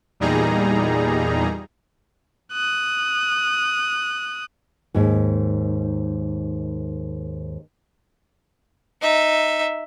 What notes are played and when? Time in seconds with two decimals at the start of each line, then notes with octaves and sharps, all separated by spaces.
0.20 E2 A#2 G3 D#4 G#4 A#5
2.52 D#6 F#6
4.94 D#2 G#2
9.01 D#4 E5